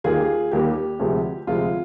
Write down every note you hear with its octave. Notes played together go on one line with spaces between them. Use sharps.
D#2 D#3 G3 A#3 F4 G#4
D#2 D#3 G3 A#3 G4
D2 C3 F3 G#3
D2 C3 F3 G#3 F4